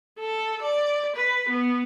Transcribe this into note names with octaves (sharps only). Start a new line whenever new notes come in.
A4
D5
B4
B3